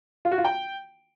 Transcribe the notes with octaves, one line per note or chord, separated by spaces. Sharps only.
F4
F#4
F4
G5